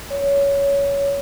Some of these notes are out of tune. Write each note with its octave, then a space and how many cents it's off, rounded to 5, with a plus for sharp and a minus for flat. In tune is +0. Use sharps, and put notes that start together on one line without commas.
C#5 +15